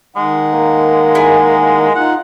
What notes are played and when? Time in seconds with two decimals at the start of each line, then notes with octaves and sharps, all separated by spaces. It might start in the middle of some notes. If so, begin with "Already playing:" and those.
0.16 D#3 G#3 D#4 F#5
0.54 A#3
1.15 E4 G#4 G#5
1.95 D#4 F4 F#5